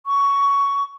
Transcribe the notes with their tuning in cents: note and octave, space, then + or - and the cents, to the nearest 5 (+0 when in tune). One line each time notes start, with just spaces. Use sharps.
C#6 +15